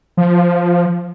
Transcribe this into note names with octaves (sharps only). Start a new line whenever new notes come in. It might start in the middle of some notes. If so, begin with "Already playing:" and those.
F3